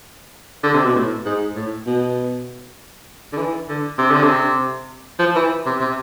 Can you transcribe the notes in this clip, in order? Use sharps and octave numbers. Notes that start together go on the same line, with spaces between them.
D3
C3
B2
A2
G#2
A2
B2
D3
E3
D3
C3
D3
C3
F3
E3
C3
C3